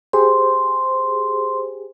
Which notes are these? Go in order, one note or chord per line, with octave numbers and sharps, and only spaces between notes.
G4 G#4 C5 C6